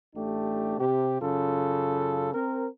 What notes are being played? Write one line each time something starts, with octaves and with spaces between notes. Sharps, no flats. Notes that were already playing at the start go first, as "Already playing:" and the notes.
A1 A3 D4 G4
C3 G4
F#2 C#3 F4 A4
C4 A#4